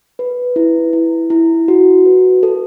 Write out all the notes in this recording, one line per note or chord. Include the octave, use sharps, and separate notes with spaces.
B4
E4
E4
E4
F#4
B4
A4